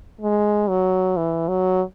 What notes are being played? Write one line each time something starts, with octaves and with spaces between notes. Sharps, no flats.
G#3
F#3
E3
F#3